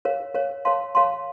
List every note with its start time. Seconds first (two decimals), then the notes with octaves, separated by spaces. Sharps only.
0.05 A#4 C#5 F5
0.35 A#4 C#5 F5
0.65 A#4 C#5 F5 A5 C6
0.95 A#4 C#5 F5 A5 C6